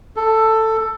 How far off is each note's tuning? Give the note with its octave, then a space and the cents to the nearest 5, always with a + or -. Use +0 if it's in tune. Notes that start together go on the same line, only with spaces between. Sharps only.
A4 +10